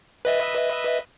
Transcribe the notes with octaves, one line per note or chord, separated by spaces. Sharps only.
B4 D#5 E5